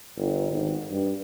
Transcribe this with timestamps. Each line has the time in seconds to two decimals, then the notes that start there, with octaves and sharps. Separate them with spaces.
0.17 G1
0.51 G#1
0.91 G2